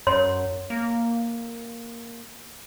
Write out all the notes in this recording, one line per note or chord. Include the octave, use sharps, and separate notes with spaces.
F#2 C#5 C6
A#3